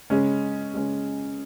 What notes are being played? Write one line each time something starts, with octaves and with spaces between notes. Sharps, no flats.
C#3 G#3 C#4
C#3 G#3 C#4